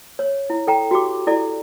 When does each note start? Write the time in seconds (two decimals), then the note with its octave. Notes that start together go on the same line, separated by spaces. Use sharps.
0.19 C#5
0.50 E4
0.67 A4 G5 A#5
0.91 F#4 G4 D6
1.27 E4 A4 D5